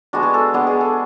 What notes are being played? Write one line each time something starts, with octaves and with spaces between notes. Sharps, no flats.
G#3 B3 D4 F#4
G#4
A4
G#3 B3 D4 G#4
G#4
A4